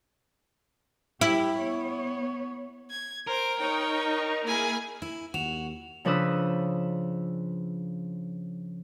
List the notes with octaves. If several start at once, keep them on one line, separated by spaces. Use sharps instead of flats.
E4 G4
B3 C#5
G#6
A#4 C5 D7
D#4 C#5 G5 C#6
A#3 E4 G#4 G#5
E4
D#2 F#4 E7 F7
C#3 F3 D4 B4 D#6 E6